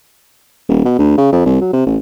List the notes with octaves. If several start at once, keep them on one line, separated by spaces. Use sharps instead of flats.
D#1
B2
D2
C#3
F2
C2
F#3
C3
A1